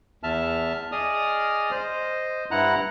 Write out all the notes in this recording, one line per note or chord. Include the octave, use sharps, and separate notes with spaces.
E2 E5 A5 F6
G#4 D5 D#5 D#6 F6
C5 D#5
G2 E4 F#5 A#5 F#6